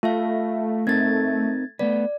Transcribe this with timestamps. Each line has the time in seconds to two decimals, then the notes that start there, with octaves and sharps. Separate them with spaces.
0.03 A3 F4 E5 F5
0.87 C4 D#4 A#4 G#6 A6
1.79 A3 B3 B4 D5